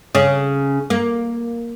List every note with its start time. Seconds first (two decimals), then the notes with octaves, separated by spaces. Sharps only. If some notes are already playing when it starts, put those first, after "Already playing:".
0.15 C#3
0.90 A#3